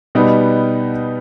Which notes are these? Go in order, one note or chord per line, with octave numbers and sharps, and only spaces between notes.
B2 G3 B3 D#4